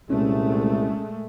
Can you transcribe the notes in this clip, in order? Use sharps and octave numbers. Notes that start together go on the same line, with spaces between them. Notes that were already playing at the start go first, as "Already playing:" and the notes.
C2 A#2 G#3 A3 C#4